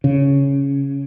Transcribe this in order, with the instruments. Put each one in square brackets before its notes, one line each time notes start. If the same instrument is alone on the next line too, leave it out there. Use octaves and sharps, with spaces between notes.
[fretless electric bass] C#3